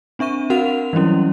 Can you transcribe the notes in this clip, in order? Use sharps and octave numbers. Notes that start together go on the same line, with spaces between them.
C4 D4 E5 C#6 D#7
C4 F#4 A#4 F5 F#5 F7
E3 F#3 G3 C#4 E4